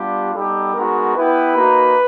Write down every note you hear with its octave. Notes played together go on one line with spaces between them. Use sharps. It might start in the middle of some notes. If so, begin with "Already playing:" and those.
Already playing: G3 B3 D4 F4 G4
G3 B3 D#4 G4 A4
G#3 B3 D#4 F#4 A#4
B3 E4 G4 B4
A#3 D#4 F#4